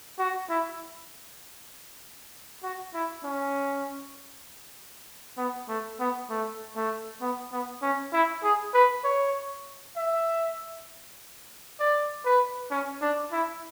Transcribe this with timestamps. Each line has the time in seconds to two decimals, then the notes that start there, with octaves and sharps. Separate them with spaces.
0.19 F#4
0.49 E4
2.63 F#4
2.94 E4
3.24 C#4
5.37 B3
5.69 A3
6.00 B3
6.30 A3
6.75 A3
7.21 B3
7.52 B3
7.82 C#4
8.13 E4
8.43 G#4
8.74 B4
9.04 C#5
9.96 E5
11.80 D5
12.25 B4
12.71 C#4
13.01 D4
13.32 E4